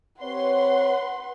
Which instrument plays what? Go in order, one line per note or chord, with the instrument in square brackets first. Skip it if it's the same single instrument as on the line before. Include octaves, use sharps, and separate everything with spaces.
[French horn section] C4 G4 C#5 [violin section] B4 C6 [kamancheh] F#5